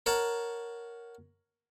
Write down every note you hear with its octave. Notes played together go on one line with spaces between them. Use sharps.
A#4 C#5 F#5 A5